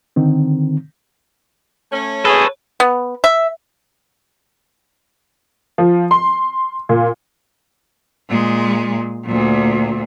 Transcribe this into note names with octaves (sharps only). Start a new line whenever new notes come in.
D3 D#3 C4
A3 C#4
G#4 A4 B4 C#5
B3
E5
F3
C6
A#2
A#2 G#3
D2 A#2